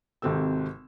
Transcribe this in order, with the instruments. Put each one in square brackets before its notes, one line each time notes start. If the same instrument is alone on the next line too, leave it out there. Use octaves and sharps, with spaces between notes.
[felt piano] G#1 C3 C4 A4 E6